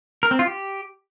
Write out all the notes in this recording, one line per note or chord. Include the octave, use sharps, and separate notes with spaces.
A#4
C4
F4
G4